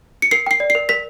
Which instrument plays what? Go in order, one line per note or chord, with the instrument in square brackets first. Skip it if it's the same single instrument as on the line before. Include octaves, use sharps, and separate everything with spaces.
[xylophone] C#7
A#4 C7
G5 C7
D5
C7
A#4
A#4 B6